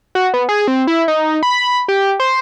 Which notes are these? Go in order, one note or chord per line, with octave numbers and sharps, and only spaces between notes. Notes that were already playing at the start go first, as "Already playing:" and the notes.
F#4
B3
G#4
C4
E4
D#4
B5
G4
C5